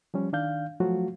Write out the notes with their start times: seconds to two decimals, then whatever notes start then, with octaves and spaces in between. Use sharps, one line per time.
0.14 F3 G3 C#4
0.33 D#3 D4 F5 G6
0.80 F3 F#3 A3 F4 F#4